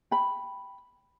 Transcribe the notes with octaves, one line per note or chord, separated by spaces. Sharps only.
G5 B5